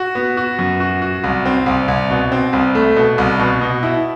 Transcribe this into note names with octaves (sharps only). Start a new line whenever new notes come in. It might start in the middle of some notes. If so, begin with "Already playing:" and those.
Already playing: F#4
B3
F#4
F#2
F#4
F#4
C2
C4
C2
C2
B2
C4
C2
A3
B2
C2
B2
B2
E4